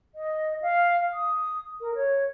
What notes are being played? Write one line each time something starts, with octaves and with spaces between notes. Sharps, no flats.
D#5
F5
D#6
A#4
C#5